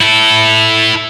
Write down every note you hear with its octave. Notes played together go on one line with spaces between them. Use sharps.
E4 A4